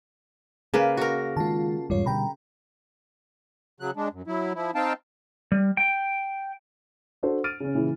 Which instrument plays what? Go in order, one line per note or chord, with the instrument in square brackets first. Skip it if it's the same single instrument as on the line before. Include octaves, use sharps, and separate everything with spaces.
[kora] C#3 A#3 B4 [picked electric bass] C4 C#4
[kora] F#4 A#4
[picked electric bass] D#3 G#3 [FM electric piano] F4 A5
[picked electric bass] A1 E2 G#2 [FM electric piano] G3 F4 C#5
[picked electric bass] B2 D3 G3 [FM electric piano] G5 A#5 B5
[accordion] C#3 F#3 F#6
G#3 D4
F#2
F#3 E4
F3 E4
C4 D#4 F5 G5 A5
[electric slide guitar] G3
G5
[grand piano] D4 F#4 A4 C5
F6 A6 D7 D#7
C#3 C#4
A#2 C#3 E3